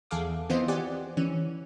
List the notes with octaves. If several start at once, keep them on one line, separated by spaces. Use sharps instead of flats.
E2 G#4 A4 F5 D6
E3 B3 C4 F4 C5 D#5
G4 D5 F#5 G#5
E3 C#4